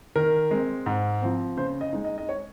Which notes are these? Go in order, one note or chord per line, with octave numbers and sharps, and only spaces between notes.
D#3 A#4
G#3 C4
G#2
F3 C4
C#3 C5
D#5
G#3 D#4
D#5
D#5
C#5